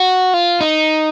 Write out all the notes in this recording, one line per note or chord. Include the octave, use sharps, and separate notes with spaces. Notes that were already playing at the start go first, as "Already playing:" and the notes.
Already playing: F#4
F4
D#4